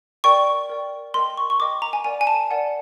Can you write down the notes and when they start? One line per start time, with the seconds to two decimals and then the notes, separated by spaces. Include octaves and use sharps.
0.24 A#4 D5 G5 C#6
0.69 A#4 D5 G5
1.14 A#4 D#5 G5 C6
1.37 C#6
1.50 C#6
1.60 A#4 D#5 G5 D6
1.82 A#5
1.93 G#5
2.04 A#4 D5 F#5 G#5
2.21 G#5
2.27 A5
2.51 A#4 D5 F#5